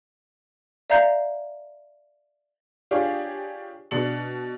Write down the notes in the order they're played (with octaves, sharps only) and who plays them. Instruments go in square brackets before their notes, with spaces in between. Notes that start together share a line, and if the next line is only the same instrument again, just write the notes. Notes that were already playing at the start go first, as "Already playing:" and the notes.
[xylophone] D5 E5 F5 A#5 G6 C7
[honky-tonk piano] D4 F4 G4 G#4 C#5 D5
B2 D4 C#7 F#7